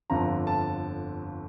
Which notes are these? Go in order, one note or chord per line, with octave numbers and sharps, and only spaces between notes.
G1 F2 D3 F3 A#5
A5